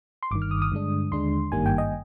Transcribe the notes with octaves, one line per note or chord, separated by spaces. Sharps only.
C6
G1 G2 D#3 D6
F6
D#6
D#6
G2 D3 G#3 D4
D#2 D3 G#3 D4 C6
G#1 G2 D#3 G3 A#3 G#5
G5
D#5